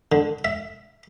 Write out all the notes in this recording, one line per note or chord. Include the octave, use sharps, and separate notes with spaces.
D3
E5